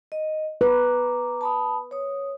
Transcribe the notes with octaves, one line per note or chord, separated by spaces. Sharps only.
D#5
B4 A#5 D6
A5 B5 D#6
C#5 D#6